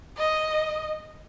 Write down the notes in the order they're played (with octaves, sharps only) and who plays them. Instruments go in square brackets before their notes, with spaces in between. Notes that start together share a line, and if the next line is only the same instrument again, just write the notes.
[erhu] D#5